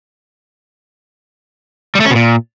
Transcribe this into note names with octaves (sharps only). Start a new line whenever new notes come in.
G3
A3
C#4
B2
A#2